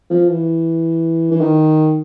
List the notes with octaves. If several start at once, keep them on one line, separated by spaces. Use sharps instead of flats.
F3
E3
E3
D#3